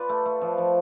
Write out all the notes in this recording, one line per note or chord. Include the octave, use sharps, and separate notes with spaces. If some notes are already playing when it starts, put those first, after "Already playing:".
Already playing: F4 B4 D5
A3
A3
F3
F3